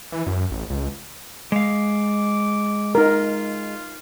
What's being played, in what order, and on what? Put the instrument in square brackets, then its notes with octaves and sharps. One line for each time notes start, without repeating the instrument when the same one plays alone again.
[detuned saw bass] E3
F#2
A1
C#2
[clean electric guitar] G#3 F5 [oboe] D6
[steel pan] D#4 A#4 [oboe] F4